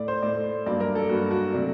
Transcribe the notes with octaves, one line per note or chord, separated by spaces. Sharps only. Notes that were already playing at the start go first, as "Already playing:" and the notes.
Already playing: A2 A3 D5
C5
A2 A3 D5
G2 F#3 A#3 D5
A#4
A4
G2 F#3 A#3 F#4
F#4
C3 F#3 A3 D4